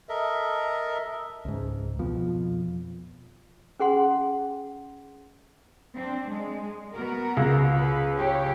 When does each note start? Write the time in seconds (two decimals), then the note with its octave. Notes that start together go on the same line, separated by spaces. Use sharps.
0.09 A4 A#4 D#5 E5
1.45 C#2 G#2
1.99 F2 B2 F3
3.80 C#4 G#4 F#5 C6
5.95 C4 D4
6.31 G#3
6.93 B3 F#4 A#4
7.37 C#2
7.75 B4
8.17 G4 C#5